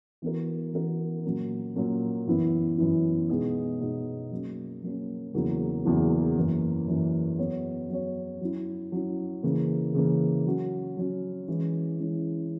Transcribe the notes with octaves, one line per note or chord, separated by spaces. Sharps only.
E3 B3 F#4 A#4
E3 B3 F#4 A#4
A#2 F#3 A#3 C#4
A#2 F#3 A#3 C#4
F#2 E3 B3 E4
F#2 E3 B3 E4
B2 G#3 B3 D#4 G#4
B2 G#3 B3 D#4 G#4
F#3 A#3 C#4
F#3 A#3 C#4
E2 C#3 F#3 A#3 E4
E2 C#3 F#3 A#3 E4
F#2 E3 A#3
F#2 E3 A#3
F#3 B3 F#4 C#5
F#3 B3 F#4 C#5
F#3 C#4 E4
F#3 C#4 E4
C#3 E3 A#3
C#3 E3 A#3
F#3 C#4 F#4
F#3 C#4 F#4
E3 G#3 C#4 E4
E3 G#3 C#4 E4